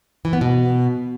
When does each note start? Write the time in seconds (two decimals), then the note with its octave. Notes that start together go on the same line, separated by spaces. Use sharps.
0.25 E3
0.33 B3
0.41 B2